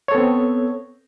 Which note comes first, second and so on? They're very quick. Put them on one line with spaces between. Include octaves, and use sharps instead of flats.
C#5 A4 B3 C4